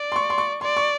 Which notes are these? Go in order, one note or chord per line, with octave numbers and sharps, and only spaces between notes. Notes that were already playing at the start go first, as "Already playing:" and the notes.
Already playing: D5
C6
C#6
C6
C#6
D5 C6
C#6